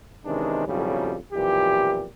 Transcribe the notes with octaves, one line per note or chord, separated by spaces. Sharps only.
C3 D#3 E3 G#3 C#4 D4
B1 F2 A2 C#3 F#3 G3
B1 F2 A#2 E3 G4